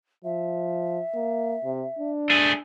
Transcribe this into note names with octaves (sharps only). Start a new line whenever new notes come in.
F3 E5
A#3
C3
D4
A3 G#4